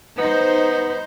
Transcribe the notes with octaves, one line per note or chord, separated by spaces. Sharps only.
B3 D#4 C5